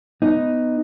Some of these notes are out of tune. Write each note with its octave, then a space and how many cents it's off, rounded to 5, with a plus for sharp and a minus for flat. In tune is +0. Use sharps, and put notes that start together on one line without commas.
B3 +10 D#4 +0